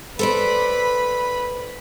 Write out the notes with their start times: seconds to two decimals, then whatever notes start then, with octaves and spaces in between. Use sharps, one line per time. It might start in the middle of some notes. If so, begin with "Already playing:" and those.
0.19 A4 B4 C5 D5 B5